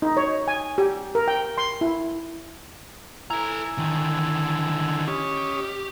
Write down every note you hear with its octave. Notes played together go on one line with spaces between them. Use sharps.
D#4
C#5
G#5
G4
A#4
G5
C6
E4
E4 A4 G#5 A#5
D3 D#3
C#4 G4 C#5 D#5